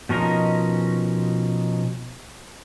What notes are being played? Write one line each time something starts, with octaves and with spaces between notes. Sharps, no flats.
B2 F3 C#4 D#4 A#4 D#5